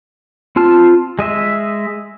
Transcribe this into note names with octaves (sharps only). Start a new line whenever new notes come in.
C4 F4 A5 F6
G#3 D#5 E5